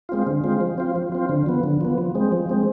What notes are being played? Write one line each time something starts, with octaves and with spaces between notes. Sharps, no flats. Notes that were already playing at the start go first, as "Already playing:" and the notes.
G#3 C4 F4
D3
G#3 C4 F4
F3
C4 F4
F3
C4 F4
D3
F3 B3
D3
F3 B3
F3
G#3 C4
F3
G#3 C4